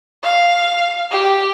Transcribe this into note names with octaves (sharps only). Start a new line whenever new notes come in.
F5
G4